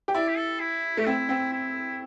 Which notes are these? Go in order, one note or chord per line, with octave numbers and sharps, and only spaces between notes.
G4
E4 D5
G4
A4
E4
A3 G4
C4 E4
C4
E4